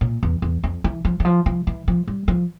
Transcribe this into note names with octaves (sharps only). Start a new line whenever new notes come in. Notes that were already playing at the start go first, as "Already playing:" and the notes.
A#2
E2
E2
F2
E3
F3
E3
F3
F3
E3
F3
G3
F3